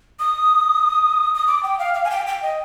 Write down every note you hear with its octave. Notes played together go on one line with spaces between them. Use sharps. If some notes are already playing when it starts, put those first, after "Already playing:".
D#6
D#6
D6
G5
F5
F5
G#5
G5
G5
D#5